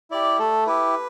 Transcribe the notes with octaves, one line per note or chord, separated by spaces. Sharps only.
E4 G4 D5
A3 A4
E4 G4 B4